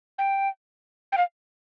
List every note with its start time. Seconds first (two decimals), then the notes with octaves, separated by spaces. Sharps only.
0.18 G5
1.12 G5
1.17 F5